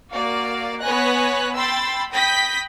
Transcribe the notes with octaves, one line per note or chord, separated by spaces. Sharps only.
A#3 F#4 D5 F5
B3 B4 C#5 G#5 F#6 A#6
G5 B5 C6 E6 A6
G5 B5 D#6 G6 A#6 B6